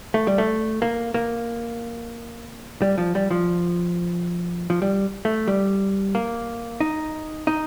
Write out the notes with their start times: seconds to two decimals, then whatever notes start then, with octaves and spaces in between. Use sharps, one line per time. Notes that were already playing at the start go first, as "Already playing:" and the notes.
0.14 A3
0.27 G3
0.38 A3
0.82 A#3
1.14 A#3
2.82 G3
2.98 F3
3.15 G3
3.31 F3
4.70 F3
4.82 G3
5.25 A3
5.48 G3
6.15 A#3
6.81 D#4
7.47 D#4